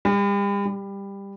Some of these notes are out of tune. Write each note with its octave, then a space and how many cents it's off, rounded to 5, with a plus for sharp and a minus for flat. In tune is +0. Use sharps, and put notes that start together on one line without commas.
G3 +40
G3 +15